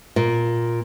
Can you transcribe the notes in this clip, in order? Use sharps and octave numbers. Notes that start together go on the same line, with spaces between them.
A#2